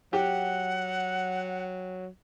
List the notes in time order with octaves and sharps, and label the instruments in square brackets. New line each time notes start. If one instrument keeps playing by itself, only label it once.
[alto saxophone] F#3 [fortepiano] G4 [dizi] F#5